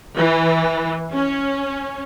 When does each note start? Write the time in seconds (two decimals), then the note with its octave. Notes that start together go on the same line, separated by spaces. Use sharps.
0.17 E3
1.12 C#4